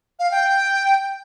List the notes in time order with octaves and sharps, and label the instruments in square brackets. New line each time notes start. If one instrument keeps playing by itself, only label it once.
[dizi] F5
G5